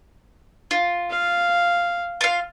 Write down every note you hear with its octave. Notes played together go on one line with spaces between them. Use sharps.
F4
F5
F4 F5